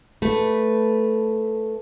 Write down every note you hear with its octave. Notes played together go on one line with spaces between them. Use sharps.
A3 B4